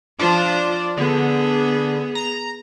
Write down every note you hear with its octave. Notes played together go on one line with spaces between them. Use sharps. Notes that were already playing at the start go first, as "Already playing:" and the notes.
F3 D4 F4 C5
D3 B3 G#4
A#5